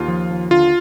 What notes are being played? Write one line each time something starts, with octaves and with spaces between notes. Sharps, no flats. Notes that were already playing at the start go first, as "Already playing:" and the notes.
Already playing: D#2 F4
F3
D#2
D3 F4